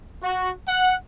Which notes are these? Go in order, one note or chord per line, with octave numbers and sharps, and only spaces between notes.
F#4
F#5